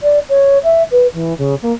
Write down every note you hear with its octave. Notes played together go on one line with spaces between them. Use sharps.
D5
C#5
E5
B4
E3
C#3
A#3